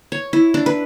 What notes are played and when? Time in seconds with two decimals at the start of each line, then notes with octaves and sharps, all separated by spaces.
0.12 C#5
0.33 E4
0.54 D4
0.66 B4